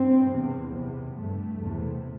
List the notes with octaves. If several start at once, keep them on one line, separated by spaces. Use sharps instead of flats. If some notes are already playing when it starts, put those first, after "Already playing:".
Already playing: G2 C4
E2 C3
E2 C3
G2 A3
E2 C3